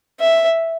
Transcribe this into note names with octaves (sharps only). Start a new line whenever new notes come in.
E5